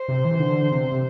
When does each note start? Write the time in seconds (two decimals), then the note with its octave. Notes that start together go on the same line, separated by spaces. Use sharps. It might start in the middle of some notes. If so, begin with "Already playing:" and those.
Already playing: C5
0.08 C3
0.25 E3
0.40 D3
0.71 C3
0.92 C3